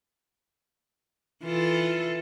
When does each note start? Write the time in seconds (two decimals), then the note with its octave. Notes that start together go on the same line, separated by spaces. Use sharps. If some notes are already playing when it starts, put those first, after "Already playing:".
1.43 E3 F4 A4